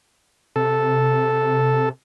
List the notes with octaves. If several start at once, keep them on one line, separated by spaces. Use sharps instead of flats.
C3 A4